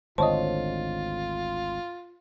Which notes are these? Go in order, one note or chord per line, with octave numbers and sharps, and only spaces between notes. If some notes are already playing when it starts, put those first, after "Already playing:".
G#1 D2 D3 F4 C5 C#5 D#5 A5